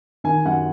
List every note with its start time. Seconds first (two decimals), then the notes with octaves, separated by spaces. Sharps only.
0.24 D#3 G#5
0.46 F#2 F#5